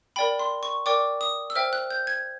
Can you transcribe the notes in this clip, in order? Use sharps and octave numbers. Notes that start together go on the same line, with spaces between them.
A#4 D5 G5 B5
C6
C#6
A#4 D5 G5 D6
D#6
E6
C5 E5 G5 F6
F#6
G6
G#6